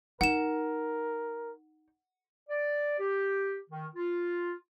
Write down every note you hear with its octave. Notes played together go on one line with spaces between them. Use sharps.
D#4 A#4 F#5 E7
D5
G4
D#3
F4